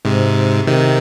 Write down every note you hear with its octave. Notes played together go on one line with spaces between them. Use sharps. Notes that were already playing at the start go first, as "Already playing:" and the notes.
G#2 C3
C3 D#3